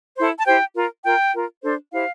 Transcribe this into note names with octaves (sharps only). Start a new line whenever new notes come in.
E4 A4 C5
A5
E4 G4 C5 G5
F4 A#4
F4 A#4 G5
F4 A#4
D4 A4 C5
E4 G4 C5 F5